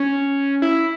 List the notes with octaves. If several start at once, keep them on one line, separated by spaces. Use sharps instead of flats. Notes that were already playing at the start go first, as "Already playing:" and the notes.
Already playing: C#4
E4